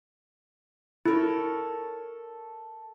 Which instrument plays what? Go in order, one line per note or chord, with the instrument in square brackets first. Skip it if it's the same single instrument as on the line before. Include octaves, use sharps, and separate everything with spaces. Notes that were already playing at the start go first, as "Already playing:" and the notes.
[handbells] E4 [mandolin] A4 A#4 C#5